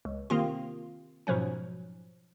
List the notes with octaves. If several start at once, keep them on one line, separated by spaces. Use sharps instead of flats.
C#2
C3 D#3 A#3 C4 F4
G#2 B2 F3 F#3 C#4